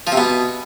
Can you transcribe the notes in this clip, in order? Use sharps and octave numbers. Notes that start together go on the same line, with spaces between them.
F3
C3
B2